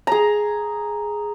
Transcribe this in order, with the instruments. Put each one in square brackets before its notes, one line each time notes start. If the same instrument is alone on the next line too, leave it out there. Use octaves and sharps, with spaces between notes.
[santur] G#4 A#5